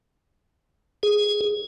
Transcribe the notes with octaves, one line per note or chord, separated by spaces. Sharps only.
G#4